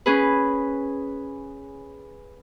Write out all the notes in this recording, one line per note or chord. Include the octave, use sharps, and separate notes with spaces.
C#4 G#4 B4